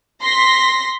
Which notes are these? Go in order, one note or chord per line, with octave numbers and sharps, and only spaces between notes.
C6 A#6 B6